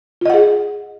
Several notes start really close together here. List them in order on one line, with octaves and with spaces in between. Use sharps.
F4 D#5 F#5 G#4